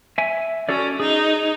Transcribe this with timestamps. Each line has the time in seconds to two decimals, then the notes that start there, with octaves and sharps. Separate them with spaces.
0.18 E5 G#5
0.69 C#4 F#4 A4 D5
1.00 D#4 G#4